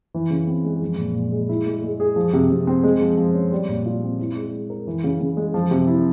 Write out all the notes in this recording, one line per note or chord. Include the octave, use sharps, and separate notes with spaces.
E3
C#3
C4
G#3
F3
A#2
A#2
G#3
E4
G#3
G#3
G#4
F3
C3
C3
C4
G#3
F3
F3
C#4
G3
A#2
F4
C4
E4
G#3
G#3
A#4
E3
C#3
C#3
G#3
F3
C3
E4